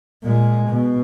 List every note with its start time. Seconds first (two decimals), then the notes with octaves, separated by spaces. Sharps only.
0.24 A#2 G#3
0.70 B2